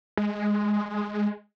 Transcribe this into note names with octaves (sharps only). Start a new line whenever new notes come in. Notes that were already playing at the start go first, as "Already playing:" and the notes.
G#3